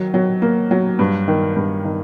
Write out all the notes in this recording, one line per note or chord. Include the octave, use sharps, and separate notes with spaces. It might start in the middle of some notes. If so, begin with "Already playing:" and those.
Already playing: D#3 F#3
F#3
A#3
F#3
G2
D#3
G2
D#3